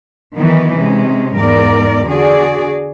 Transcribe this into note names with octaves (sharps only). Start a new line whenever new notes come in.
D#3 E3 F#3 B3 D#4
C3 G#3 C#4
E2 G#2 A#4 D5
D3 F#4 G#4 D5